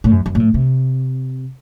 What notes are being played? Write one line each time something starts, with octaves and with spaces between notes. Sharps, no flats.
A2
F#2
F#2
A#2
A2
C3